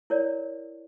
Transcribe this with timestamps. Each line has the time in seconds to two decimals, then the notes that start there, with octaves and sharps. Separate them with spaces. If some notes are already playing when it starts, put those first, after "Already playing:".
0.10 E4 A#4 C#5 D5